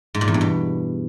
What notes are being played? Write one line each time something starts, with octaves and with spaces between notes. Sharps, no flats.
G#2
A#2
E2
G2
B2